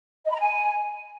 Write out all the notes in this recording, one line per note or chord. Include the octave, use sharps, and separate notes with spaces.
D#5
B5
A#5
G#5